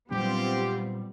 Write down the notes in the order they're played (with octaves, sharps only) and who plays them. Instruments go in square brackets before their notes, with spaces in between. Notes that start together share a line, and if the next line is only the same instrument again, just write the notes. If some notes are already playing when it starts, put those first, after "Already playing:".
[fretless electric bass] A#2 F#3 D4 [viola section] G3 [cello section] B3 C4 F4 [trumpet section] G4